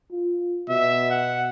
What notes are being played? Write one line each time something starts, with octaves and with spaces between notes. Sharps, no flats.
F4
B2 E5
F#5